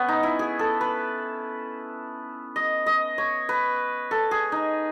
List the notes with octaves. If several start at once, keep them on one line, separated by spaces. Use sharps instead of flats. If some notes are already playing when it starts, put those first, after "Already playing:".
Already playing: B3 C#4
D#4
E4
G#4
A4
B4
D#5
D#5
C#5
B4
A4
G#4
D#4